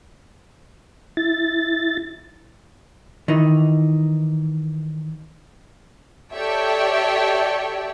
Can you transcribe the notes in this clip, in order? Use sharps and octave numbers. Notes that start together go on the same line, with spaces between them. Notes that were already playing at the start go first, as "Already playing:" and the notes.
E4 A6
D#3 E3 D#4
G4 A4 C#5 D5 E5